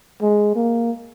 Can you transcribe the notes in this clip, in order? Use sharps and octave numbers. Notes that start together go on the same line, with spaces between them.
G#3
A#3